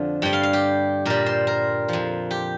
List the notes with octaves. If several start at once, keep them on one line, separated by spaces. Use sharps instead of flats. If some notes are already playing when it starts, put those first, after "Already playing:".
Already playing: F2 D3 F3
G2 G3 G5
F5
F5
G4
A#2 G3 A#4
C5
A#4
F2 F3
G4